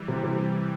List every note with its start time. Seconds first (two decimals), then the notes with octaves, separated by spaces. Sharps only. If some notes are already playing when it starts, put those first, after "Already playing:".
Already playing: E3 G3
0.08 C3
0.23 C3